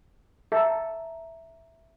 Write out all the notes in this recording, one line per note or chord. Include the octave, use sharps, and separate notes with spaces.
A4 E5 A#5